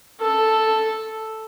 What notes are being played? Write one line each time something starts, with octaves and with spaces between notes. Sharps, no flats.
A4